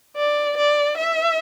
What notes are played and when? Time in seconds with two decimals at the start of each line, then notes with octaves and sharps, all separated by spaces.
0.16 D5
0.57 D5
0.98 E5